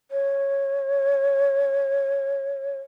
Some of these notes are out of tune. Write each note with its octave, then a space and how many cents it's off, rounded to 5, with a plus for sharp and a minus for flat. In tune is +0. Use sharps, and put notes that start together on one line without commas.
C#5 -10